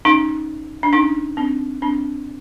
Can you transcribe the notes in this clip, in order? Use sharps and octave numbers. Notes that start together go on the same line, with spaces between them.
C#4 D#4
D4
C#4 D#4
C4 D4
C4 D4